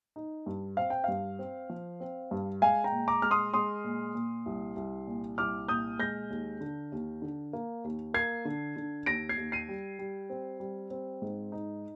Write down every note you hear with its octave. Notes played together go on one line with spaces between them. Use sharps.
D#4
G2
C4 F5
G5
G2 F5
C4
F3
C4
G2
G#3 F5 G#5
G5 A#5
A#2
A#5 D6
G#3 F6
C6 D#6
G#3 C6 D#6
A#2
A#2
C2
C2
A#2
C2 D6 F6
A#2 D#6 G6
G#3 G6 A#6
D#2
D3
D#2
D3
A#3
D#2
A#3 G#6 C7
D3
D3
D#2 A#6 D7
G#6 C7
D#2
C7 D#7
G3
G3
C4
G3
C4
G#2
D#4